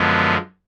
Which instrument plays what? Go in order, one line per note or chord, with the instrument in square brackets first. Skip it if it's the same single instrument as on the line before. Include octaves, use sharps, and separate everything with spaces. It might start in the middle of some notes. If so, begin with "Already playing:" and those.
Already playing: [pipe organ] F#2 D3 F3 G#3 B3